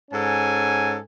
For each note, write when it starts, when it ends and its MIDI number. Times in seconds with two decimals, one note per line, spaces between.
0.11 0.98 44
0.11 0.98 61
0.11 0.98 69
0.11 0.98 80